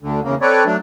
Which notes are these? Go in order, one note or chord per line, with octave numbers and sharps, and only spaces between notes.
D2 D3
E2 C#3 A#3
C4 A4 B4 C#5 D5
F#3 A3 D4